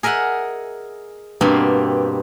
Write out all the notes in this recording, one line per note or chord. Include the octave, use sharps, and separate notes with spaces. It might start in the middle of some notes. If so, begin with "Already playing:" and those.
G#4 A#4 D#5 E5 F#5
G2 B2 A#3 C4